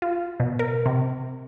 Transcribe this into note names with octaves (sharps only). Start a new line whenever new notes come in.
F4
B2
A#4
C3